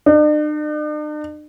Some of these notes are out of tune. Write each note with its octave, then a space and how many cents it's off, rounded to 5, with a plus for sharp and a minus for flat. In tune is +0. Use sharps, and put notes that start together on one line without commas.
D4 +45